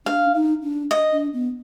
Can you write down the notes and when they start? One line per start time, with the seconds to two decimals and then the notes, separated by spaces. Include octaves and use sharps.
0.06 D4 F5
0.34 D#4
0.63 D4
0.91 D#5
1.12 D4
1.33 B3